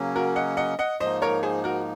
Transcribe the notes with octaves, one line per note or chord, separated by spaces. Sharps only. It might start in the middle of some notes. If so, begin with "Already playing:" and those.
Already playing: C#3 F#3 A#3 C#4
F#4 A#4
D#5 F#5
D#5 F#5
D#5 F#5
G#2 F3 A#3 D#4 C5 D#5
A#4 C#5
G#4 C5
F#4 A#4